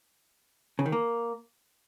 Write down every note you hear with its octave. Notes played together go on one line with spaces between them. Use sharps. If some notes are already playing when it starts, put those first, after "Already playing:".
C#3
D#3
A#3